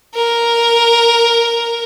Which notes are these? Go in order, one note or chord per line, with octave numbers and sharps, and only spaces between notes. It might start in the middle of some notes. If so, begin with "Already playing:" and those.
A#4